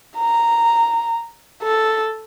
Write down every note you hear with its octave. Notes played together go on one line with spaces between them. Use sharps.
A#5
A4